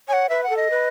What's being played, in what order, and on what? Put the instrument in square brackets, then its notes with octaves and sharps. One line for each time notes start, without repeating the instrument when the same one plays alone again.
[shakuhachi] C#5 [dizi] F#5 G#5
[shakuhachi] B4 [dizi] E5
[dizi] F#5
[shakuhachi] A4
[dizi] D#5
[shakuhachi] B4